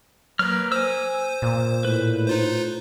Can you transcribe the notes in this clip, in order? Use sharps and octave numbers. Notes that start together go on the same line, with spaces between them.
F#3 A#3 B4 F6
C5 G#5 E6
A#2
A2 B4
D#4 F4 C5